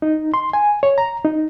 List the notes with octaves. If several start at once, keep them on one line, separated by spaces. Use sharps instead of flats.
D#4
C6
G#5
C#5
A#5
D#4